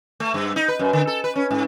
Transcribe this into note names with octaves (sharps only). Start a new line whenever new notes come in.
A3
G2
D#4
B4
F#2
D3
A4
B4
C#4
G#2